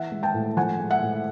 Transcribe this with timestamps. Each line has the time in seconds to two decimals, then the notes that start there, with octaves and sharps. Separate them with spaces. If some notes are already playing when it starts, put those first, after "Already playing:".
Already playing: E3 E5 F#5
0.12 G#3
0.23 G5 A5
0.34 A2
0.57 F3 F#5 G#5
0.79 G#3
0.90 E5 F#5
1.02 A2